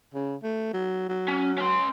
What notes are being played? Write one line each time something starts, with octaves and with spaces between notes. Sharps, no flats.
C#3
A3
F#3
F#3
C#4
C#4 C6